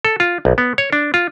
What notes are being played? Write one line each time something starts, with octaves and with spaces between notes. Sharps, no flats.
A4
F4
B1
B3
C#5
D4
F4